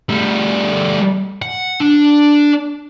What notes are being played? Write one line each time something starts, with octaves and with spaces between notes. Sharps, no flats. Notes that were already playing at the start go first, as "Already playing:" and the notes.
G3 A3
F#5
D4